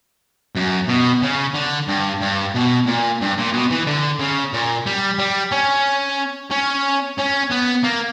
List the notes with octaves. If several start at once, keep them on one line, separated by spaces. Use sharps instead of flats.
F#2
B2
C#3
D3
G2
G2
B2
A#2
G2
A#2
B2
E3
D3
C#3
A#2
G3
G3
C#4
C#4
C#4
B3
A#3